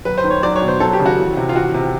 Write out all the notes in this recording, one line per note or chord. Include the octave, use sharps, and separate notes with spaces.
F#3 B4
C5
D#3
C#5
F#3 D5
C#5
B2
C5
F#3 A4
G4
C#3
F#4
E3
C3
F4
E3 F#4
C3